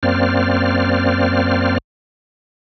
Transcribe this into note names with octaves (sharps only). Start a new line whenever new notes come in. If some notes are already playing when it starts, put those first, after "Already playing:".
F#2 A#3 C4 C5 D5 F6